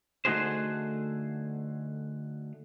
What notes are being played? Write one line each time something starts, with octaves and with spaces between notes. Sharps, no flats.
D3 A3 D#4 F#4 G#4 C5